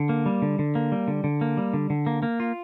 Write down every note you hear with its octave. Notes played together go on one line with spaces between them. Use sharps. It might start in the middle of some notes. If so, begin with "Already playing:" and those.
Already playing: D3
A#3
G3
D3
D3
A#3
G3
D3
D3
A#3
G3
D3
D3
A#3
A#3
F4